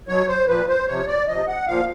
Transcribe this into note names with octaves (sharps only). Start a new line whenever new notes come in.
B2 F#3 C#5
C5
A#2 F3 B4
C5
C3 F3 C#5
D5
C3 F3 D#5
F#5
A#2 F3 F5